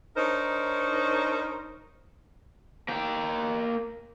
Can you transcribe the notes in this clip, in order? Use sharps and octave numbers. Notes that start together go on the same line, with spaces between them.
D4 D#4 A#4 C5 C#5
A#3 G5